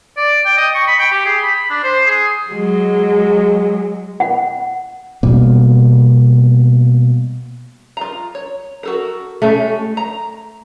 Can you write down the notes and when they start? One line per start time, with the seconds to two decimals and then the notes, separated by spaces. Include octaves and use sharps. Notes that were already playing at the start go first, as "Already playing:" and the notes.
0.17 D5
0.45 G5
0.57 D#5
0.75 C#6
0.88 B5
0.99 G5
1.11 G4
1.25 G#4
1.43 B5
1.70 D4
1.83 C5
2.06 G#4
2.50 F#3 G#3
4.20 F#5
5.23 B2 G3 A#3 B3
7.97 F4 A#5
8.35 C#5
8.83 F#4 A4 A#4
9.42 G#3 A3 C#4 G4
9.97 A#5